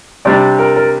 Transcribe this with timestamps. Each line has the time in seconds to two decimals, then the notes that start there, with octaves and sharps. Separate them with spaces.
0.25 C3 G3 D4 D5
0.59 A#4
0.76 A#4